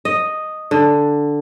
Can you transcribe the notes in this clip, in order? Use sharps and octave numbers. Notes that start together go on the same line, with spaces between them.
D#5
D3